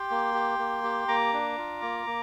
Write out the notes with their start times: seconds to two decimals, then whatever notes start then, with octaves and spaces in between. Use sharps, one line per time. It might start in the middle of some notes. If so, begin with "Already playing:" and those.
Already playing: G4 G5 C6
0.11 A#3
0.35 G4
0.59 A#3
0.84 G4
1.08 A#3 A#5 D6
1.33 D4
1.58 F4
1.82 A#3
2.06 A#3